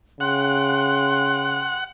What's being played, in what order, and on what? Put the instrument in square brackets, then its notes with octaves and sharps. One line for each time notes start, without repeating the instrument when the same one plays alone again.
[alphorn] C#3 [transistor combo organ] F#5 [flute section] G5 C6 F#6